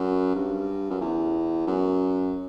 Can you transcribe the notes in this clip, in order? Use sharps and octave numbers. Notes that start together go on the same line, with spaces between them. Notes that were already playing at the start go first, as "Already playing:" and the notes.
Already playing: F#2
G2
F#2
E2
F#2